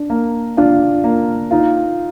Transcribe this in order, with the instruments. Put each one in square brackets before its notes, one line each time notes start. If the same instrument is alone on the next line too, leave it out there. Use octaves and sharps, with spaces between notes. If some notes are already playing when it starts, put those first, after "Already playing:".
Already playing: [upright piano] D4
[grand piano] A#3
[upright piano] D4 [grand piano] F4
[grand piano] A#3
[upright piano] D#4 [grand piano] F4